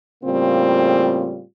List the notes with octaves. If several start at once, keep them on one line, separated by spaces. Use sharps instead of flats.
A2 C#3 G3 A#3 C4 F4